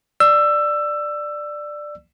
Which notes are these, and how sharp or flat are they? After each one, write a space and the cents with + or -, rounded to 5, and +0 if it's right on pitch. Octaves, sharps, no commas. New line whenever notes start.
D5 +10 E6 +20